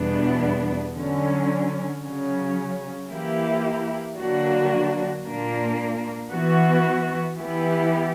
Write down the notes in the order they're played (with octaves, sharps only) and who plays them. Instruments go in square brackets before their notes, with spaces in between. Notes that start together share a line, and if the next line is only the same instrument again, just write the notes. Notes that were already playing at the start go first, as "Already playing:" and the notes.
Already playing: [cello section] E2 B2 G3 B3 D4
D3 F#3 C#4
C#3 F#3 C#4
E3 A#3 E4 G4
D3 F#3 A#3 D4 F#4
A#2 A#3 D4
E3 B3 F#4
E3 B3 E4 G4